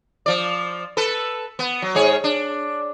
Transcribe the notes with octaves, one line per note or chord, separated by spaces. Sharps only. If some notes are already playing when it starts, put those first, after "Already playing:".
F3 D5
A4 B4
B3
F#3
G#2 G#4 C#5
D4